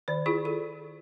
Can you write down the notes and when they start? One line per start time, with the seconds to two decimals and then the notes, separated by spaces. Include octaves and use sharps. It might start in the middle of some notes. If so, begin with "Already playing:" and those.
0.08 D#3 D5
0.26 E4 F4 G#4
0.45 A4